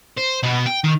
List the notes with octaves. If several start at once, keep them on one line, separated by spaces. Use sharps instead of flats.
C5
B2 B3
G5
D#3